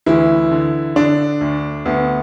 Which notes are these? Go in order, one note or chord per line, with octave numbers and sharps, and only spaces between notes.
D2 E3 E4
D3
D3 D4
D2
D2 B3